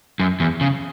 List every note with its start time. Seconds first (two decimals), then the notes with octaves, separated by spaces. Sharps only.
0.20 F#2
0.40 E2
0.61 C#3